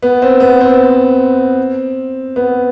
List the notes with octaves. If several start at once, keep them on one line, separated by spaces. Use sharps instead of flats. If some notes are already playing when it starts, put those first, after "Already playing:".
B3
C4
B3
C4
B3